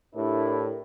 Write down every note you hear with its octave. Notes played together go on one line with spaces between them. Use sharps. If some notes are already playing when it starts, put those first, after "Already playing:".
A2 D4 E4 G4 A#4